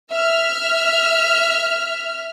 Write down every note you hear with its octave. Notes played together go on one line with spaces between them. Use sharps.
E5 F6